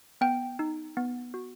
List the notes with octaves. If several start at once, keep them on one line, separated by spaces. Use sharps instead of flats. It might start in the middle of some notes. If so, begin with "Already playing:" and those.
B3 G5
D#4
B3
F#4